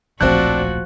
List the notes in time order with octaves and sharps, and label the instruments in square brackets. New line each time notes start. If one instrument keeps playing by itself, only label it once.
[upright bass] D1 A#1 [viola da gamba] F3 F#4 [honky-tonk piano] C4 F#6 [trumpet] D4